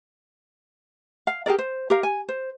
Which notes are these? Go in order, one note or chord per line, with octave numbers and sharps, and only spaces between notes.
F5
G4 G#4 A#4 D5
C5
G4 A#4 F5
G#5
C5